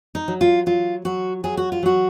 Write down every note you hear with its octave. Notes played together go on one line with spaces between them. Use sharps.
D#4
F#3
F4
F#3 F4
F#3 F#4
F#3 G#4
F#4
F4
F#3 F#4